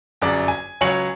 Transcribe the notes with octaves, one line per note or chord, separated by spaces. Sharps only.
G1 F#2 G#4 D5 D6
G#5
C#2 F#3 C#5 G#5 C#7 F#7